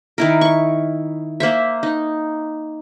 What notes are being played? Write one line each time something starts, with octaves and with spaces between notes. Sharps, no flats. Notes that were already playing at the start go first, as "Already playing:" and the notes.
D#3 E4 A#4
C#6
A#3 C5 E5
D#4